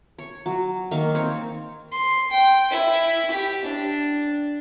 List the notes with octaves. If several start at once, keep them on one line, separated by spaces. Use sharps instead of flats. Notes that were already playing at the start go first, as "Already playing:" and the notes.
C#5
F#3
D#3 A#3 F5 C#6
C4 C#5
C6
G5
E4
G4
D4